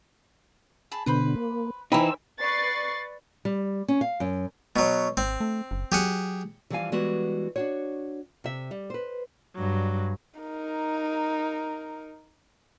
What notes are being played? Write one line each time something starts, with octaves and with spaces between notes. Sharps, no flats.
G#4 A5 B5
B2 D3 B4 C5 B5
A#3
E3 D#4 C5 G5 G#5 B5 E6
B4 D5 C#6 A6 C7
G3
C#4
F5
F#2
B2 F#3
G#1 C4
A3
F#1
F#3 G4 G#4 F#5
E3 F3 G3 F4 F5 G#5
E3 G3 G#3 B3 F#4
D4 F#4 C#5
C3 E5
G3
B4 C5
G2 F#3
D#4 A#4